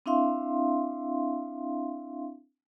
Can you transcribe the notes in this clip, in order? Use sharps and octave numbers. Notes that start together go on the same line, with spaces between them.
C4 D4 E4 E5 F5 C6